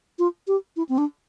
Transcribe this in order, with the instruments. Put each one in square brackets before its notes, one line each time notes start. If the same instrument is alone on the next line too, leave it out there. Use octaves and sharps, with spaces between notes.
[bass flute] F4
G4
E4
C4
D4